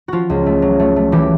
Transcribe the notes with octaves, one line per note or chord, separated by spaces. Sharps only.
F3 F4 F#4
C#2
A3
F#3
A3
A3
E3 G4